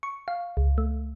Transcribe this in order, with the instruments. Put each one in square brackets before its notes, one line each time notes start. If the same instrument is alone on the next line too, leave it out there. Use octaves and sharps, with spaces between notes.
[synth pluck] C#6
F5
C#2
A3